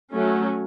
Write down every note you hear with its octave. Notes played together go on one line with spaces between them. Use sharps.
F#3 A3 C#4